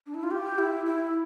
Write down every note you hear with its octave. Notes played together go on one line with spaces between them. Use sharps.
D4
E4
F4
G4
E4
E4